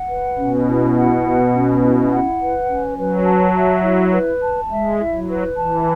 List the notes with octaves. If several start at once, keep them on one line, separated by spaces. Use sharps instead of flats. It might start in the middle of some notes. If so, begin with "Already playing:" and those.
Already playing: F#5
B4
B2 C#4
E4
F#5
B4
C#4
E4
F#5
B4
C#4
F#3 B4
A5
E5
E4
B4
A5
G#3 E5
E4
F#3
B4
E3 A5